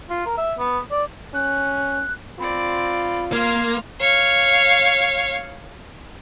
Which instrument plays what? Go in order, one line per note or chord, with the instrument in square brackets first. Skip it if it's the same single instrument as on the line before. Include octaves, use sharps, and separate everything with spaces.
[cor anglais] F4
A#4
E5
B3
D5
[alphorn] C#4 [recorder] F#6
[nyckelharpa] C4 D5 [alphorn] F4 [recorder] B5
[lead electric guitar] A#3 [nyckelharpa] F5 C6 [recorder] G#6
[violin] C#5 F5